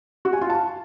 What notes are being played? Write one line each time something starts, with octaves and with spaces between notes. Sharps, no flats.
F#4
G#5
F4
A5